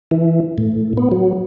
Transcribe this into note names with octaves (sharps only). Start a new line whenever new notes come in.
E3
A2
B3
F#3